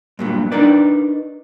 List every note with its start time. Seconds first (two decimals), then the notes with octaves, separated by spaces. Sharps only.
0.19 G2 A#2 F#3
0.52 D4 D#4 A#4 B4 D5